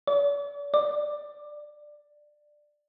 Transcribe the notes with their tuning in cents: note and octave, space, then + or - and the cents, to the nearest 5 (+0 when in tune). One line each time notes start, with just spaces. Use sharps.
D5 -45
D5 +10